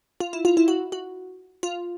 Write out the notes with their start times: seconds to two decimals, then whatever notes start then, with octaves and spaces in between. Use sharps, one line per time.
0.20 F4
0.33 E4
0.45 F4
0.57 E4
0.68 F#4
0.92 F#4
1.63 F4